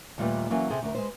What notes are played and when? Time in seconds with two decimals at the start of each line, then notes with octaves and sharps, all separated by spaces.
0.18 D#2 A#2 G3 A3 G4 B4
0.50 E3 F#3 A#3 C#4 A4
0.70 C3 C4 G#4 A4
0.83 D2 A#4
0.95 G#3 B4 C5